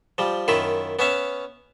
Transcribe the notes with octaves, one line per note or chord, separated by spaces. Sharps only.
F3 G3
F#2 D#3 E4 F4 B5
B3 C#4 E5 F5